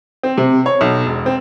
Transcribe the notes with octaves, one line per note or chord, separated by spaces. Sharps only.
C4
C3
C#5
B1
E1
C4